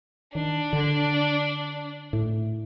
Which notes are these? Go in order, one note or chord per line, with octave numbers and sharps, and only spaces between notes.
D#3 D4
D3
A2